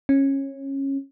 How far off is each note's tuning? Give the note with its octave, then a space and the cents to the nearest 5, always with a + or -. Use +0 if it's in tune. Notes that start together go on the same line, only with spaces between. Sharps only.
C#4 -20